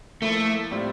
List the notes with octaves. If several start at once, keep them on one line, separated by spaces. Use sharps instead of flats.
F3 A3 A#3 E4
A2 G3 C4 F4